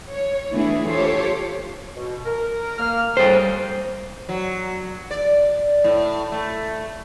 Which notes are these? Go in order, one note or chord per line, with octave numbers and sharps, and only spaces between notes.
C#5
E3 A3 B3 D4 E4 G#4
F4 G4 A4 C5 C#5
B2
A#4
A#3 F6
G2 C#3 A4 C5 G5
F#3
D5
A2
A3